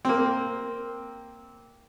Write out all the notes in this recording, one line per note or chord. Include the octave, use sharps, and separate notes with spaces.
A#3 C4